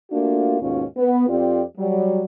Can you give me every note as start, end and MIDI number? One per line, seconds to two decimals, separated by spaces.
0.11 0.58 57
0.11 0.58 58
0.11 0.58 62
0.11 0.58 65
0.11 0.58 66
0.61 0.84 39
0.61 0.84 44
0.61 0.84 47
0.61 0.84 61
0.61 0.84 65
0.97 1.27 59
1.28 1.62 41
1.28 1.62 60
1.28 1.62 65
1.28 1.62 67
1.28 1.62 74
1.78 2.24 54
1.78 2.24 55